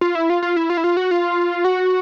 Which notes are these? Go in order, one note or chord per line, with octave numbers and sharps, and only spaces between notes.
F4
E4
F4
F4
E4
F4
E4
F4
F#4
F4
F#4